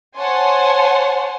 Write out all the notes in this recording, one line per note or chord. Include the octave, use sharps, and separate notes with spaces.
C5 C#5 F#5 G#5 A5 C6